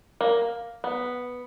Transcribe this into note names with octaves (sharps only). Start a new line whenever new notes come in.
A#3
B3